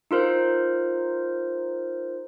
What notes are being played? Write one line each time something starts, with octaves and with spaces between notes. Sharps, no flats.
D#4 F4 A#4 C5